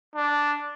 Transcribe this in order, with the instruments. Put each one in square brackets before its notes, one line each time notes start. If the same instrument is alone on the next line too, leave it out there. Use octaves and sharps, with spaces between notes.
[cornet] D4